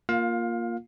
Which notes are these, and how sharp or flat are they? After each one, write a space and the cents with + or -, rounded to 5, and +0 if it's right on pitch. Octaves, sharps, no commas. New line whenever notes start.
A#3 +0 F4 +0 F5 +25